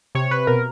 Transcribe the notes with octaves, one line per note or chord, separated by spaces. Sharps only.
C3 C#5
C3 B4
B2 A#4